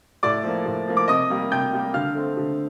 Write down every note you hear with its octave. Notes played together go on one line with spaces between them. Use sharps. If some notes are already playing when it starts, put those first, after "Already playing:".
A2 D5 D6
F3 A#3
A2
F3 A#3
D6
C3 D#5 D#6
G3 A#3
C3 G5 G6
G3 A#3
D3 F5 F6
A3 C4
D3